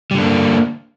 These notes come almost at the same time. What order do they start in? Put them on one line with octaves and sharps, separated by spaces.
G3 D3 D4 A#3